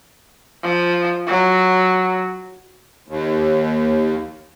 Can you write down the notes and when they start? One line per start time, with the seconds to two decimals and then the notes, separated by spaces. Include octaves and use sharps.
0.63 F3
1.27 F#3
3.08 D#2